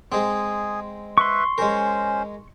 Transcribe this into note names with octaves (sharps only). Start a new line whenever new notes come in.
G#3 C4 G#4
B4 E5 C6 C#6
G#3 C#4 A#4 C5